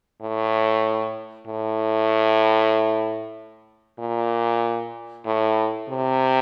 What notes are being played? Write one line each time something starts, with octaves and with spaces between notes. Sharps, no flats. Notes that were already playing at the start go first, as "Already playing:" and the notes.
A2
A2
A#2
A2
C3